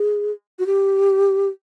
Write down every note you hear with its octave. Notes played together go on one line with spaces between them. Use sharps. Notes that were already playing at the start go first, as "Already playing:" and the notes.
Already playing: G#4
F#4
G4